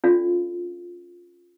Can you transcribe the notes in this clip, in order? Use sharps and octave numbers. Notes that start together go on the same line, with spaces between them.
C#4 D4 F4 A4 D5 F5